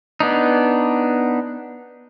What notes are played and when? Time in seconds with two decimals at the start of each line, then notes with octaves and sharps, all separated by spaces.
0.20 B3 D4 D#4